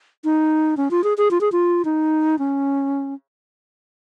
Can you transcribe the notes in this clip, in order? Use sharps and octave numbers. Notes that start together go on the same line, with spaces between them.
D#4
C#4
F4
G#4
G#4
F4
G#4
F4
D#4
C#4